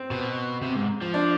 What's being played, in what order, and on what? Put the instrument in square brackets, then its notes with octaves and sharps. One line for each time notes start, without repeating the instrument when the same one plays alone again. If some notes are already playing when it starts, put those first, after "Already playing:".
Already playing: [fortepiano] C4
[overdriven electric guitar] B2
C3
G#2
F3
[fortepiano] D4